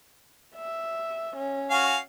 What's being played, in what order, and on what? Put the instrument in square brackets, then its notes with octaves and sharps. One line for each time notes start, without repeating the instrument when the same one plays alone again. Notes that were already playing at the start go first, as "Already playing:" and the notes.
[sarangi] E5
C#4
[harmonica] F#4 F5 G#5